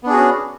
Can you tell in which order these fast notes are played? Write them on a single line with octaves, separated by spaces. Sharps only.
B3 D4 G#4 F#4 C#4